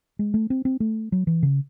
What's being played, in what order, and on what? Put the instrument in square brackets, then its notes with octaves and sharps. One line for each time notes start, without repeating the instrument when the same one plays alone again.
[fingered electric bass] G#3
A3
C4
C4
A3
F#3
E3
C#3